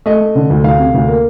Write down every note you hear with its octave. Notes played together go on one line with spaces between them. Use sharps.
A3 D#5
A3
D3
D2
D2 F5
C3
D2
A#3